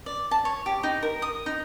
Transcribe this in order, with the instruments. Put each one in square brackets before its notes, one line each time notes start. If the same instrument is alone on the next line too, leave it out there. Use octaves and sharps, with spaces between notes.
[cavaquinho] D5
A5
C#5
G4
D#4
A#4
D#6
D#4